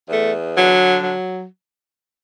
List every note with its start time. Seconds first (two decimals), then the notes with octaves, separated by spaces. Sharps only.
0.09 E2 A3
0.56 D3 F#3
1.02 F#3